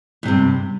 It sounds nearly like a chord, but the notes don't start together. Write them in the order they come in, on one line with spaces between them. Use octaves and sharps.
E2 C3 G2